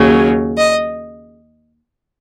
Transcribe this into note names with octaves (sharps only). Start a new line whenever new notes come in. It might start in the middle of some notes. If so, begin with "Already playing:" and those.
Already playing: D#2 C#3 F#3
D#5